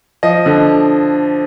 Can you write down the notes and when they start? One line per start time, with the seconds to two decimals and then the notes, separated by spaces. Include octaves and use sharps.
0.23 F3 D#5
0.46 D3